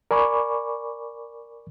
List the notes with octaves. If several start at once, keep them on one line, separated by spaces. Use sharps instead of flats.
A#4 D5 G#5 B5 C#6 D6